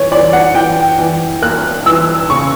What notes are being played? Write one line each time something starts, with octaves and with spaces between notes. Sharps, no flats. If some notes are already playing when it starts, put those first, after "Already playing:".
Already playing: E3 C#5
E3 D5
F#5
E3 G5
E3
A#3 F#6
E3 E6
C#3 C#6